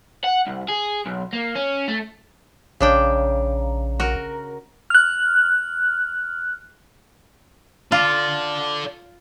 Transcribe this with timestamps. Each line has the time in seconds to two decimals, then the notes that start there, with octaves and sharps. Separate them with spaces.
0.24 F#5
0.47 C2
0.68 G#4
1.06 B1
1.33 A#3
1.56 C#4
1.88 A3
2.81 A#1 C#3 D4 G5
4.00 F#4 A#4
4.90 F6 F#6
7.92 F4 A4 D5